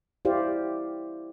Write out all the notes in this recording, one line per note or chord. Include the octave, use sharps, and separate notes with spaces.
E4 G4 C5 D5 F5